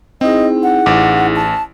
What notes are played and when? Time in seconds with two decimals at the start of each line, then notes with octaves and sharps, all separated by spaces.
0.21 C4 D#4 E4 G#4 D#5
0.63 F#5
0.86 A1 D6
1.36 A5